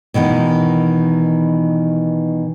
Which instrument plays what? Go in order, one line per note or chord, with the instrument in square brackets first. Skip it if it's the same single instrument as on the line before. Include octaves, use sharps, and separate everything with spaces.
[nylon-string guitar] B2 D#3 E3 B3